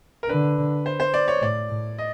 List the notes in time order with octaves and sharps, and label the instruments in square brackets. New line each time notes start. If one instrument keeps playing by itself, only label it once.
[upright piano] A#4
[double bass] D3 [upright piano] B4
[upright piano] C5
C5
D5
C#5
[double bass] A2 [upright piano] D5
[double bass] A2
[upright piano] D#5